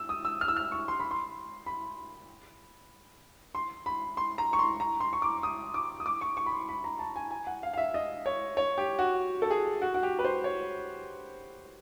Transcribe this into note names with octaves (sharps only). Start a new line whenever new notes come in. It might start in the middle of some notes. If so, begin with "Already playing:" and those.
Already playing: E6
D#6
E6
F6
E6
F6
C#6
C6
B5
C6
B5
C6
B5
C6
A#5
C#6
C6
A#5
C6
C#6
D6
D#6
D6
D#6
D6
C#6
C#6
B5
C6
B5
A#5
A5
G#5
G#5
F#5
F5
F5
E5
D#5
C#5
C#5
G4
F#4
A4
G#4
F#4
F#4
G4
B4
C5
C#5